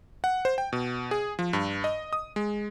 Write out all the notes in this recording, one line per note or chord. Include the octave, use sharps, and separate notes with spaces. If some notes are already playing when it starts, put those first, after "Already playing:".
F#5
C5
G5
B2
G#4
F3
G2
D#5
D#6
G#3